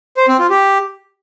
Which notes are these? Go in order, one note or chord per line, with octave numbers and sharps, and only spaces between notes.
C5
C4
F4
G4